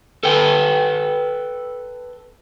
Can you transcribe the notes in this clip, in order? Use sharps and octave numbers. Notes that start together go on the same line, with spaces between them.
A4 B4 G5